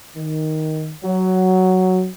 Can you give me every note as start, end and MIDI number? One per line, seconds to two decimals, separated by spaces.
0.16 0.91 51
1.03 2.08 54